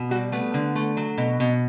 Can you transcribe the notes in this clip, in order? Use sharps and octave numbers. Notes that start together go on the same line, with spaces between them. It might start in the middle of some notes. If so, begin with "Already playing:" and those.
Already playing: B2
G3 F#4
A3 B3
D3
A3
F#3
B2
B2